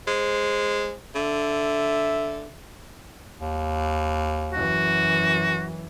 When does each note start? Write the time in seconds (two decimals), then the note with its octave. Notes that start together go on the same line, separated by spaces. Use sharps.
0.08 G#3 C5
1.15 D3 E5
3.39 D#2
4.53 F#2 E3 F#4